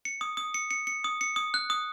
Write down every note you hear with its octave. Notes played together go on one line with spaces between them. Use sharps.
C#7
D#6
D#6
C#7
C#7
C#7
D#6
C#7
D#6
F#6
D#6